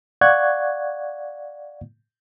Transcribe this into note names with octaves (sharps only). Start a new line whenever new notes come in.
D5 F5 F#5 C#6 F#6 G#6